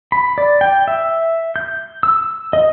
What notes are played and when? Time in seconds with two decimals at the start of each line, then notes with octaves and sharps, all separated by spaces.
0.12 B5
0.38 D5
0.61 G5
0.88 E5
1.56 G6
2.03 E6
2.53 D#5